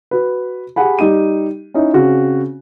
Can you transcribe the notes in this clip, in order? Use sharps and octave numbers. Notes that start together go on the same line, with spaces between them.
F#4 B4
G4 G#4 F#5 G#5 B5
G3 D#4 G4 D#7
C#4 D#4 E4
C#3 C4 F#4